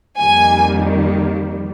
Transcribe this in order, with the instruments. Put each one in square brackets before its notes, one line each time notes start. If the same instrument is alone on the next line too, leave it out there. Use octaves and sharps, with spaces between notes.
[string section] F2 D#3 G3 A#3 G#5